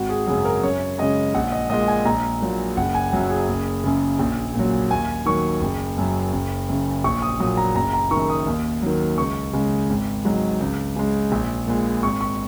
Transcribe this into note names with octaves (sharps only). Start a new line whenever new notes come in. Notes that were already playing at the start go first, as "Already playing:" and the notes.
Already playing: G#1 F#4
G#4
F#2 C#3 F#3 G#4
A#4
F#2 C#5
C#3 G#3 D#5
A#1 F#5
D#5
A#2 G#3 D#5
G#5
A#1 A#5
A#2 F#3
F#1 F#5
G#5
F#2 F#3 F#5
G#4
F#1
F#2 C#3
A#1
A#2 F#3
D#2 G#5
D#3 F#3 C#6
F#1
F#2 F#3
F#1
F#2 C#3
A#1 C#6
D#6
A#2 F#3 D#6
A#5
F#1 A#5
A#5
F#2 D#3 C#6
D#6
D#2
D#3 F#3
C#2 C#6
C#3 G#3
G#1
G#2 F#3
C#2
C#3 G#3
A#1
A#2 G#3
G#1 C#6
C#6